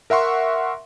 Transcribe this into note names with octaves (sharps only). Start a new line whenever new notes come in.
A#4 E5 F#5 C6 C#6